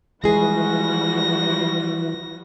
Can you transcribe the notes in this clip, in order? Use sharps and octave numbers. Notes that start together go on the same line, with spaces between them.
E3 F3 G3 G#3 F#4 G#4 A#6